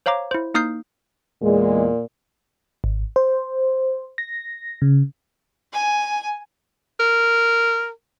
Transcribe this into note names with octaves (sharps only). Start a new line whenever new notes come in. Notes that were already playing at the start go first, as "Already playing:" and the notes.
C5 C#5 F5 A#5 D6
E4 C5
A#3 D#4 D#6 F6 G6 C7
E2 A#2 G#3
G#1
C5
A#6
C#3
G#5
A#4